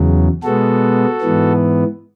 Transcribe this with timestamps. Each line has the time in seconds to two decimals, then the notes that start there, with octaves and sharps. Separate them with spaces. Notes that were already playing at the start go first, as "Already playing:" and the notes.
Already playing: E2 C#3 F#3
0.43 B2 G#3 B3 F#4 A4
1.21 G#2 E3 B3